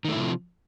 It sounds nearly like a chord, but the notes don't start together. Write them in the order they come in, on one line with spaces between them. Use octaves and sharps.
D#3 A3 E4 C3 F3